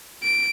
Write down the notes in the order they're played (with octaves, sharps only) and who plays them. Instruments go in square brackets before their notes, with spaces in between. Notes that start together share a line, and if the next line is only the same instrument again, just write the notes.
[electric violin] D7